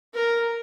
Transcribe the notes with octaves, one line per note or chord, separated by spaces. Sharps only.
A#4